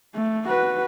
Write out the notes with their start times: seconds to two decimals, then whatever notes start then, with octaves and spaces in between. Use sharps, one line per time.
0.15 A3
0.48 F#4 B4